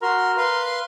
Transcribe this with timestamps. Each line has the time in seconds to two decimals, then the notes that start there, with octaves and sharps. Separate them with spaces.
0.02 F#4 A#4 C6
0.37 B4 F5 C6